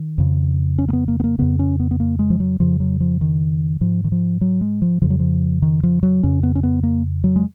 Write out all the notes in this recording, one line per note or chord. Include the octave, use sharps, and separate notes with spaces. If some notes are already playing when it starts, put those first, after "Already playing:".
Already playing: D#3
F2 C#3
C#4
A#3
B3
A#3
B3
A#3
F2 C#3 B3
C#4
B3
B3
A#3
G#3
F3
F#3
F2 C#3 F3
F#3
F3
D#3
G#2 F3
D#3
F3
F#3
G#3
F3
F2 C#3 F3
F#3
F3
D#3
F3
F#3
F2 C#3 C#4
B3
C#4
B3
A#3
F#3
G#3